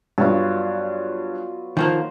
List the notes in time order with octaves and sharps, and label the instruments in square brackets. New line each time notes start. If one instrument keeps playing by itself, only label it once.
[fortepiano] G2 [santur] F#3 B3 F4
[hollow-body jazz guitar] D#3 F3 A#3 [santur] C5 F#5